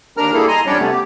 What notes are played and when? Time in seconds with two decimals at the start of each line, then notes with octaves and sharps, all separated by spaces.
0.17 D#2 D4 A#4 A#5 F6
0.34 G3 A#3 E4 G#4 A4
0.48 D#5 G#5 A#5 C6
0.66 F2 G3 C#4 D4 C#5 D5
0.79 C3 A3 B3
0.91 G4